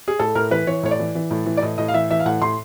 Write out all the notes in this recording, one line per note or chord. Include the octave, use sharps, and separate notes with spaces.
G#4
A2 A4
A2 A#4
E3 B4
E3 C#5
A2 C#5
D5
E3
E3
A2
E3
D5
A2 D#5
A2 D#5
F5
E3 E5
E3 E5
F5
A2 F#5
A2 C6